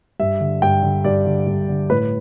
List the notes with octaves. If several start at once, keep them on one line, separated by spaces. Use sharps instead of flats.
G2 E5
D3
G2 G5
D3
G2 D5
D3
G2
D3
A2 B4